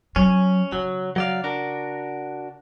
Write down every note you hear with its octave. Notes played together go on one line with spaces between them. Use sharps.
F#3 C#4
C#3 F#3
F#3 D5 F5
D4 F#4 A#4